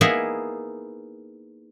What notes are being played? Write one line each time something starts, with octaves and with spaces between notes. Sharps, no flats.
A#3 B3 D#4 E4 G#4